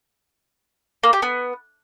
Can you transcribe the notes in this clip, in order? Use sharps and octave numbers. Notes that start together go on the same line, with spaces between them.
A#3
G4
B3